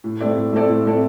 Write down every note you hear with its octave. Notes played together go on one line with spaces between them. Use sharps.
A2
A3 C4 A4 D5
A2
A3 C4 A4 D5
A2
A3 C4 A4 D5